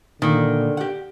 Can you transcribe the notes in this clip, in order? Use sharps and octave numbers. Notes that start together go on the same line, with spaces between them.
A#2 D3 D#3 A#3
G4 F#5